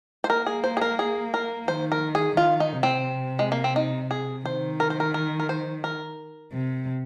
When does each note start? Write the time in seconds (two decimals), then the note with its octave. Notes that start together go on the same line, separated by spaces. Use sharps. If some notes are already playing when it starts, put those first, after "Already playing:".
0.24 C5
0.30 A#3 A#4
0.46 G#4
0.64 C5
0.77 G#4
0.81 A#4
0.99 G#4
1.34 A#4
1.68 D#3 C5
1.92 A#4
2.15 G#4
2.37 D#3 F4
2.60 D#4
2.72 C3
2.83 C4
3.39 G#3
3.52 A#3
3.64 C4
3.76 D#4
4.11 G#4
4.45 D#3 C5
4.80 A#4
4.90 C5
5.00 A#4
5.14 A#4
5.40 A#4
5.49 C5
5.84 A#4
6.53 C3